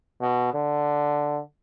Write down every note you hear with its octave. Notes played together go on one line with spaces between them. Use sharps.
B2
D3